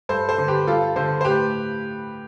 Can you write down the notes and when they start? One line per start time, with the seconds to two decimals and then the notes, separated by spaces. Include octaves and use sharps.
0.09 G2 A4 C5
0.29 A4 C5
0.38 D3
0.48 G4 B4
0.67 G2 F4 A4
0.96 D3 A4 C5
1.21 C5
1.25 A2 G4 B4